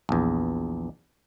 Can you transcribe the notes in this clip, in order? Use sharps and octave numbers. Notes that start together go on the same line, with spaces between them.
A#1 E2